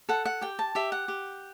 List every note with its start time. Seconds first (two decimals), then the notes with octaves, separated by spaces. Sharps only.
0.09 A4 F#5
0.25 F#5
0.41 G4 G5
0.59 A5
0.75 G4 E5
0.92 F#5
1.08 G4